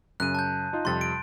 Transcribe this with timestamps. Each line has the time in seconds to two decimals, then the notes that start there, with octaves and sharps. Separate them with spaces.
0.20 F#2 C#3 G#5 F#6 D#7
0.35 A5 G6
0.73 D#4 F4 D#5
0.85 F2 C3 G3 C6 A6
1.01 D7